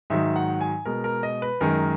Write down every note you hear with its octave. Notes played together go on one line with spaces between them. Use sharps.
G#2 D#3 F#3 E5
F#5
G#5
B2 G#3 A#4
A#4
D#5
B4
F#2 D#3 G#3 A#4